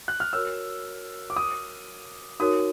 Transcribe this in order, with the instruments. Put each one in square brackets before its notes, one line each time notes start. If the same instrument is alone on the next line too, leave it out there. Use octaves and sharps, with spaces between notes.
[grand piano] F#6
F6
[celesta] F#4 A#4 C#5 [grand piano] E6
[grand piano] D6
D#6
[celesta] D#4 F#4 A#4 C#5 [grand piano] D#6